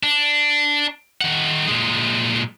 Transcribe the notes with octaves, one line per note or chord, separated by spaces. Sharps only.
D4
D#3 F#5
A#2 G#3